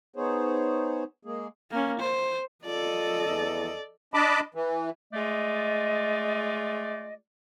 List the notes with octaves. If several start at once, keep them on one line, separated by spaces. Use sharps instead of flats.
B3 D#4 G#4 C5 C#5
G#3 A#3 G#4
A#3 C#4
C5
F4 A4 D5 D#5
E2
D4 D#5 A5 B5 D6
E3
G#3 A3 F4 D5 D#5